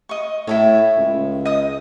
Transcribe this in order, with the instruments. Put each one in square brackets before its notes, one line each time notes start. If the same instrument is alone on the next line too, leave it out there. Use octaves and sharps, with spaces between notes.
[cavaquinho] D#5 C#6
[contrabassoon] A2 [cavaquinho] E4 A4 C#5
[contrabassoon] C#2
[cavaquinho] D#5 D#6